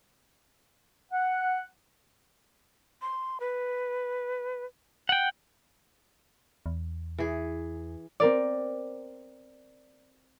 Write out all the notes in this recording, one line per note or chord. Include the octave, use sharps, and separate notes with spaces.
F#5
C6
B4
F#5 G5
E2
E3 G#4
C4 A#4 D5